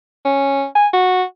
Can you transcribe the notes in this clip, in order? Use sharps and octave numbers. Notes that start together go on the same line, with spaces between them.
C#4
G#5
F#4